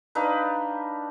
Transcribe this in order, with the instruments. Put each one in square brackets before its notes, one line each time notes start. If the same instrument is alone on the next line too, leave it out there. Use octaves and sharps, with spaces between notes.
[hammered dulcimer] D4 D#4 B4 F5